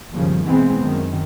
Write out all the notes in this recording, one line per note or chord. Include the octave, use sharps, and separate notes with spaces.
G1 D#2 C#3 F3
B2 E3 G#3 B3 C4
F#2 D#3